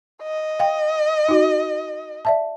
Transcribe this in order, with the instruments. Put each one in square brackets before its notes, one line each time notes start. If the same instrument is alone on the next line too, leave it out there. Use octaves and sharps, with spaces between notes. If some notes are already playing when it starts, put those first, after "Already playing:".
[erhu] D#5
[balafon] F5 G5
D#4 F#4
D5 E5 A5